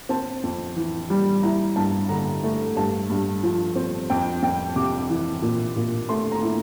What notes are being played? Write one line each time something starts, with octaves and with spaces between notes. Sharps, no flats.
C4 A5
F2
E3
G3
E4 A#5
G2 A5
D3 A#5
A3
G2 A5
G2
F3
C4
F2 G5
F2 G5
C3 D6
E3
A#2
A#2
A3 C6
A#5
E4